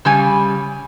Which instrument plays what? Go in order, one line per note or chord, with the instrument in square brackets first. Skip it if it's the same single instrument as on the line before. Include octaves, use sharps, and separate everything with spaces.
[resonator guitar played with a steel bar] C#3 G3 G#5